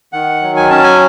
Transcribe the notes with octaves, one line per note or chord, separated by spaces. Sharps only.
D#3 F#5
F#3
G#5
C#4 A5
G#5